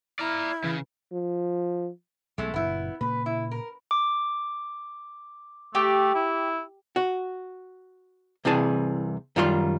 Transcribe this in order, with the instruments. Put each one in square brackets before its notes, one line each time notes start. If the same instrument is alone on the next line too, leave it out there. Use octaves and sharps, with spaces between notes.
[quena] E4 [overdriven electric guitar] D5 A#5 [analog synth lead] F6
[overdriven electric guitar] C#3 [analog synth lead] E3
[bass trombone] F3
[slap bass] B1 [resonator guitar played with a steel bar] G#3 A3
[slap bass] F#1 F#2 A#2 [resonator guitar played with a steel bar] B3 E4
[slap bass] A#2 C#3 A#3 [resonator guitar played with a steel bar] B4
[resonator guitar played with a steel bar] E4
A#4
[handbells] D6
[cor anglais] A3 [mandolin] G4
[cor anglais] E4
[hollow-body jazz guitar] F#4
C2 C3 E3 G#4 A5
F#2 D#3 G3 F4 A4 C6